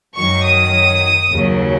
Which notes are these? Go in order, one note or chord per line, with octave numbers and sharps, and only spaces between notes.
F#2 D#3 F#3 C#6
D#6
D#2 C#3 F#3